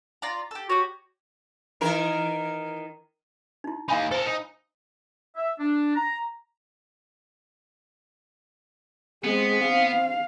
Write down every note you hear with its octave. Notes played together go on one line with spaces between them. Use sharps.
F4 D5 A#5
G4 A4
F#4 G4 C#5
D#3 E3 A#4
D#4 E4
A#3 D#4 F5 G#5 B5
A4 A#4 C5 E6
D#4
E5
D4
A#5
G#3 B3 C4
F5